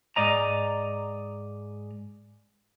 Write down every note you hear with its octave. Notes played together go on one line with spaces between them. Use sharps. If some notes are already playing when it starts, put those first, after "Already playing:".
G#2 D5 D#5 A#5